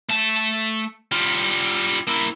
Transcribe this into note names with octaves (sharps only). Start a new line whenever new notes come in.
A3 A5
G3 F4
A#3 E4